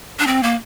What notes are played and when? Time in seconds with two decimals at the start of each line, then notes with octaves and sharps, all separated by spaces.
0.19 D4
0.27 C4
0.43 A#3